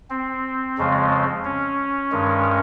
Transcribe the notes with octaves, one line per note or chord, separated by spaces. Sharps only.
C4
F2 C#3 F3 G#3
C#4
G2 D#3 G#3